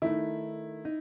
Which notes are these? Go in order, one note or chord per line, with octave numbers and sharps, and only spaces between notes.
D#3 A3 D#4 E4
D#4